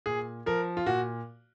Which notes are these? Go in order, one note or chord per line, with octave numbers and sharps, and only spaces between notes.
A#2 G#4
F3 A#4
F4
A#2 F#4